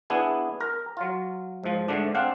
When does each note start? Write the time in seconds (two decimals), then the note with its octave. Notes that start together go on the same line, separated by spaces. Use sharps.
0.10 B3 D4 E4 G#4
0.60 A#4 A#5
0.97 F#3 F4
1.63 G#2 F3
1.88 G#2 D3 A3 D4
2.15 C4 D4 F5 F#5